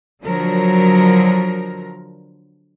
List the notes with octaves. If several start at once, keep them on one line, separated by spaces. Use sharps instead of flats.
D3 F3 F#3 A#4